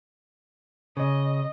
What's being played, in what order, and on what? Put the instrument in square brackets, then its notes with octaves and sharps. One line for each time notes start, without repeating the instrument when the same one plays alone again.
[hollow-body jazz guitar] C#3 [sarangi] D#5